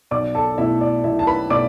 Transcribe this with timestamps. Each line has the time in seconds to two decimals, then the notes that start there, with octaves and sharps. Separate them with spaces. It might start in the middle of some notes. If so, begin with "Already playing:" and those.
0.11 B1 D5 D6
0.35 A4 A5
0.58 B2 A3 E4 E5
0.81 D5
1.04 B1 E4 E5
1.19 A5
1.27 B4 B5
1.50 B2 A3 D5 D6